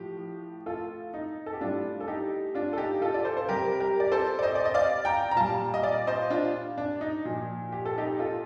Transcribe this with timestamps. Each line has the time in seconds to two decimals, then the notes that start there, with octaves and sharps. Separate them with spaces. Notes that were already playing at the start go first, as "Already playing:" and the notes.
Already playing: A2 F3 G4
0.66 F4 A4
1.14 D#4
1.46 A4
1.53 G4
1.61 A2 G3 D4 F4
2.00 A4
2.08 D#4 G4
2.55 D4 F4
2.73 A4
2.78 D#4 G4
3.02 F4 A4
3.14 D5
3.25 A4 C5
3.37 C5
3.48 C3 G3 G4 A#4
3.80 G4 A#4
4.00 D5
4.12 A4 C5
4.39 D5
4.42 C5 D#5
4.55 D5
4.65 D#5
4.74 D5 F5
5.05 G5 A#5
5.31 A#5
5.36 A#2 G3 F5 A5
5.74 D#5
5.83 D5 F5
6.07 C5 D#5
6.30 D4 F4
6.78 D4
7.01 D#4
7.25 A#2 F3
7.72 G4
7.85 A4
7.98 D#4 G4
8.19 F4 A4